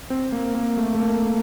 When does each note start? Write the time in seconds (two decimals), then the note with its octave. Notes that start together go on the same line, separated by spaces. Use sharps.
0.10 C4
0.32 A#3
0.55 A#3
0.77 A3
0.95 A3
1.00 A#3
1.22 A#3